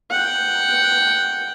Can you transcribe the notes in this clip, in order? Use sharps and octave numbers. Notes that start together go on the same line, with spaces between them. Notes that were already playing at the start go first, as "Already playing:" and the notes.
F#5 G5